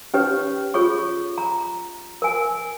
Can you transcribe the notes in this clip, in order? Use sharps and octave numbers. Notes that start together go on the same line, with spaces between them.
C#4 D#4 G4 B4 C#5
F4 G#4 C#5 C#6
A#5
A#4 G#5